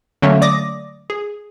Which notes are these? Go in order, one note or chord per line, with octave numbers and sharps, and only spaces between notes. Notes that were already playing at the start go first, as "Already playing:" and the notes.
D3 F#3 A3 A#3 C#4
D5 D6 D#6 A#6
G#4